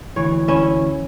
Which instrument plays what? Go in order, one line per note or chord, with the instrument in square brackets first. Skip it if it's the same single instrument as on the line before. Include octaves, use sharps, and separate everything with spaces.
[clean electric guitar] D2 E3 [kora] C#5
[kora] C#4 E4